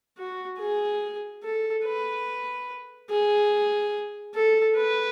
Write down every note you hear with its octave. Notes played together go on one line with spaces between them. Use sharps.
F#4
G#4
A4
B4
G#4
A4
B4